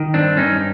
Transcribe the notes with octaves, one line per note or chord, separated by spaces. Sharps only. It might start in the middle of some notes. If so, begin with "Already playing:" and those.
Already playing: D#3
G2 C4 D4
G2 C#4 D#4